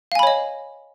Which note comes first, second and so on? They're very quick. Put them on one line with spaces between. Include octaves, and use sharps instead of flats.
F5 G#5 B5 C#5 D#5